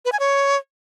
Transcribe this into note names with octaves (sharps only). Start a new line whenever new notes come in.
B4
G#5
C#5